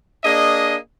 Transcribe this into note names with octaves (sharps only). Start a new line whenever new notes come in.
A#3 D4 G#4 D#5